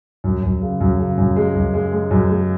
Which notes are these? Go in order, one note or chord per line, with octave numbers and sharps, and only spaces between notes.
F#2
F#2
C#3
F#2
C#3
F#2
G#3
F#2
G#3
G#3
F#2
G#3